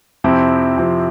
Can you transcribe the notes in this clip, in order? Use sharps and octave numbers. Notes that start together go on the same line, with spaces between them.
F2 C3 F3 C4 E4
F2 C3 F3 C4 E4